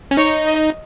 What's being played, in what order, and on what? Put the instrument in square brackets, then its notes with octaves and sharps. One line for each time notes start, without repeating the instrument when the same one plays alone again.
[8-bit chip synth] C#4
[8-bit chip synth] D#4 [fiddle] C#5
[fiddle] D#5